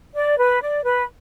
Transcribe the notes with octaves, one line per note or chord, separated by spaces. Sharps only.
D5
B4
D5
B4